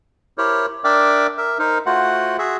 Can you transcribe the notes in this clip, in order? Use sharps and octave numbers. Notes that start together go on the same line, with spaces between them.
E4 G4 A#4 C5 C#5
D4 A#4 D5 E5 G5 D6
A#4 E5
D#4 A#4 C5
A3 F4 F#4 C5 F#5
F#4 G#4 E5